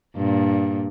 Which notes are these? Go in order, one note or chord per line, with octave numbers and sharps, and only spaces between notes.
G2 A#2